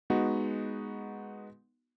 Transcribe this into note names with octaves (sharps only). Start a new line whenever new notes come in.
G#3 B3 D#4 F#4